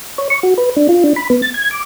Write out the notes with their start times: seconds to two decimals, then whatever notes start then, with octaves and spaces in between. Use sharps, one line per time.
0.18 C#5
0.30 C#6
0.43 F#4
0.58 B4
0.76 D4
0.89 F4
1.04 D4
1.16 B5
1.30 B3
1.42 A6
1.54 G#6
1.71 D6